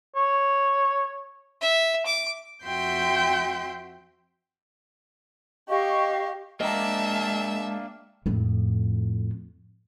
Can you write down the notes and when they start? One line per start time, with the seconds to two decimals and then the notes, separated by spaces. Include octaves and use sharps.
0.16 C#5
1.61 E5
2.06 D6
2.65 F2 F#4 E5 G5 C6 G6
5.69 G4 D#5 F5 C#6
6.61 G#3 A#3 D4 D#5 E5 G5 A5 A#5
8.26 F2 A2